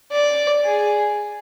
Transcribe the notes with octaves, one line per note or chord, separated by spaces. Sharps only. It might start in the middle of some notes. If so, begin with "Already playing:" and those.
D5
G#4